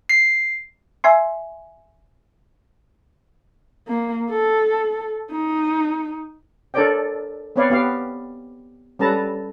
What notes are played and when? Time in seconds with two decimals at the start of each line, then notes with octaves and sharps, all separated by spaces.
0.09 C7
1.04 E5 G#5 C6
3.88 A#3
4.30 A4
5.32 D#4
6.74 D4 A4 A#4 C#5 D5 G5
7.56 B3 C4 B4 C#5 D5 F5
7.70 B3 G4 F5
8.99 G3 C#4 A4 B4 A5 A#5